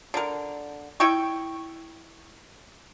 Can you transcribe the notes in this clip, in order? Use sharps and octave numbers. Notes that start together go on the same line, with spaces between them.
D3 A#4
E4 D#5 G5 C#6